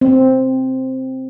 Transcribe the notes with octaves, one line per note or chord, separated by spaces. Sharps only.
C4